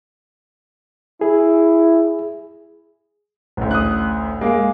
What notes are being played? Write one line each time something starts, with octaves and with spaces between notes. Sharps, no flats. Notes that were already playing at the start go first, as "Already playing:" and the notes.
E4 G#4
A1 D2
D#6 F#6
G#3 A#3